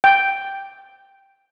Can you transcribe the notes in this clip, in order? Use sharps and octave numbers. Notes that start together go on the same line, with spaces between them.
G5